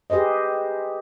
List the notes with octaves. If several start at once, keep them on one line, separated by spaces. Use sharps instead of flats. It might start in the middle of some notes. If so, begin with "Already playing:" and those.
G4 G#4 B4 C5 D#5